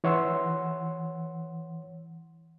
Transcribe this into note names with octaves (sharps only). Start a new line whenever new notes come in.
E3 C#5 F#5 C6 E6